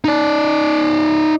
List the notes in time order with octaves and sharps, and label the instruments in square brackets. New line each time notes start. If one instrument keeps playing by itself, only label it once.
[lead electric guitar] D#4 D5